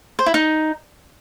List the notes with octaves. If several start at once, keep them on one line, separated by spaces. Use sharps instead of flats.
C5
E4
D#4